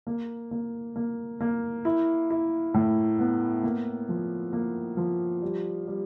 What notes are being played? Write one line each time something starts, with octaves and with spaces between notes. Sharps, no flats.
A#3
A#3
A#3
A#3
E4
E4
A2
B3
A#3
F3
A#3
F3
G3
G3